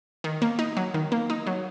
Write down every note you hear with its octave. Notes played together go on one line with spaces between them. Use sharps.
D#3
A#3
D#4
F#3
D#3
A#3
D#4
F#3